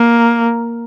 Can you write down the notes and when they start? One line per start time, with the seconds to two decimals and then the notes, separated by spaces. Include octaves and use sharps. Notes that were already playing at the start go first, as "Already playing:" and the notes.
Already playing: A#3